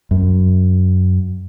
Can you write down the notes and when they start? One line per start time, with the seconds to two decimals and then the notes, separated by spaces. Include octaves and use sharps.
0.11 F#2